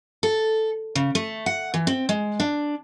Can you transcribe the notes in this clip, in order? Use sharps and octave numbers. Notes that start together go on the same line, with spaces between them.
A4
C#3
A3
F#5
E3
C4
G#3
D4